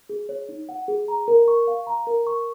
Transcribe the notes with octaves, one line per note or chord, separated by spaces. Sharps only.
G#4
C#5
D#4
F#5
G#4
A#5
A#4
C#6
F5
A#5
A#4
C#6